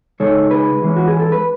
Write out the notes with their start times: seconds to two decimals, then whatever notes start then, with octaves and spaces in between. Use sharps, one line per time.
0.20 C#3 G#3 D#4 A4 C#5
0.51 G#4 B4
0.82 E3 G#3 C#4
0.96 F#4
1.08 G#4
1.19 A4
1.32 B4